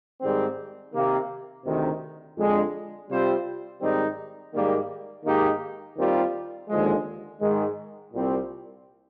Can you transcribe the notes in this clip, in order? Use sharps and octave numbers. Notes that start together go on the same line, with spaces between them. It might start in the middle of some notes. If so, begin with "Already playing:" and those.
G#2 D#3 G3 C4
C3 D#3 A#3
D2 C3 D#3
F2 D3 G#3 D4
C3 G3 C4 F4 C5
G#2 D#3 G3 C4 D#4
G#2 D#3 G3 A#3
G#2 D#3 A#3 D#4 G4
D#2 D#3 G3 C4 F4
D#2 D3 F3 G#3
G#2 D#3 G#3
C2 A#2 G3 C4